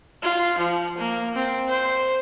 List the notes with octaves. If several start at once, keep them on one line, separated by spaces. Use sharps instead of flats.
F4
F3
A#3
C4
C5